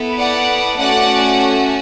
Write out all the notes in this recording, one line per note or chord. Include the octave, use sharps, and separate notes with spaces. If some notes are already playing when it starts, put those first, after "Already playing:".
Already playing: B3 E4 A4
D5 F#5
A3 C#4 F#4 D5 F#5